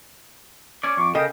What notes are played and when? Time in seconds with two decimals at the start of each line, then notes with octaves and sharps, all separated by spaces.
0.83 C#4 D5
0.97 F2 C#6 D6
1.15 C#3 A4 A#4 D#5 G5